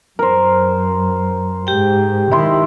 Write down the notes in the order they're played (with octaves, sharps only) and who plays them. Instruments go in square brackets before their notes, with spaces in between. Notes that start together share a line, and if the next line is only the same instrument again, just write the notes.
[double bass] F#2 [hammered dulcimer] A#4 C5
[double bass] G#2 [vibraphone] G4 G5
[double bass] D#3 [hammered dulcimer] E4 C6